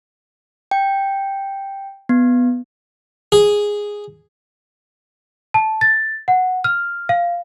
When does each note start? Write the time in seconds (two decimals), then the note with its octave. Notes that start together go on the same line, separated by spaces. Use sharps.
0.71 G5
2.09 B3
3.32 G#4
5.54 A5
5.81 A6
6.28 F#5
6.64 F6
7.09 F5